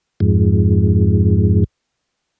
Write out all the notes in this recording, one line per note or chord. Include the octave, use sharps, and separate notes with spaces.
F2 G#2